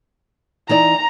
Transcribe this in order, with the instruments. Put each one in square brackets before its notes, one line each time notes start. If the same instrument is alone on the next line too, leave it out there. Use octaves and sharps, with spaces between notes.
[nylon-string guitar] E3 D#4 D5 [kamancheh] A#5